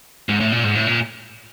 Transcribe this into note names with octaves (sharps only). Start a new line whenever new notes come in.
G#2
A2
A#2
G#2
A2
A#2